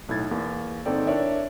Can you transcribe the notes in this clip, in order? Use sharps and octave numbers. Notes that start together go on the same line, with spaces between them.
B1 A2 E4 G#6 A6
E2 A#3
G1 C4 D#4 A4 D5 G5
D4 E4 A#4 C#5 D5 E5